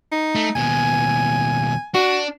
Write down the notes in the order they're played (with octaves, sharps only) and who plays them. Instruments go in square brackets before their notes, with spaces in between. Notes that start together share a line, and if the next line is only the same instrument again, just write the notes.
[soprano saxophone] D#4
[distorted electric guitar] A3
[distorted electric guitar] D#2 B2 [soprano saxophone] G#5
[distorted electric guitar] D4 [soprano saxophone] F#4